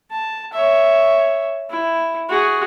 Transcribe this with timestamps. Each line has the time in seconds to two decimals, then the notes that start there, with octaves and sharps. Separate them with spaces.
0.11 A5
0.53 C#5 E5
1.70 E4
2.29 F#4 G#4